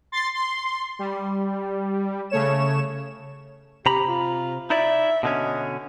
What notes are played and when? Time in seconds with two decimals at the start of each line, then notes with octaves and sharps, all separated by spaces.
0.12 C6 A6 C7
0.34 C6
0.99 G3
2.30 C#3 A3 C#5 E7
3.86 C3 G4 A#5 B5
4.08 F4
4.70 D#4 E4 D5 E5
5.23 B2 D3 C#4 D#5